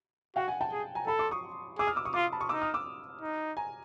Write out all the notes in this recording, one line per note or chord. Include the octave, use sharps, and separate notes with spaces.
F#4 F5 G5
F#5 G#5
G5 A5
G#4
G#5 A#5
A4 A5 B5
C6 D6
C#6 D#6
G#4 D6 E6
D#6 F6
D6 E6
C#6 D#6
F4 C6 D6
A5 B5
C#6 D#6
D#4 D6 E6
D#6 F6
D6 E6
D#4
G#5 A#5